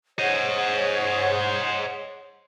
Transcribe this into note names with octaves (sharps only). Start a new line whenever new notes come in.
G#4 C5 C#5 D#5 F#5